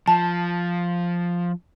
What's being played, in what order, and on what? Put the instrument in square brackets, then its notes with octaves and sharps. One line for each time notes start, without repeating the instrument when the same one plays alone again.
[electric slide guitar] F3 [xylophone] A5